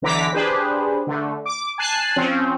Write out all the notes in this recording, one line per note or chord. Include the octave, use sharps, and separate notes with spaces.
B1 D3 E3 A#5 D6 B6
D4 G4 G#4 B4 C5
D3 A3
D6
G#5 A5 F#6 C7
F3 C4 C#4